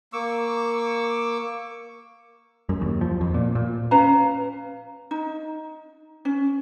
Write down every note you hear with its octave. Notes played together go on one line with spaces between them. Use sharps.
A#3 C#6 D6 E6
F#2
D#2
F3
F2
A#2
A#2
C#4 B4 F5 A#5
D#4
C#4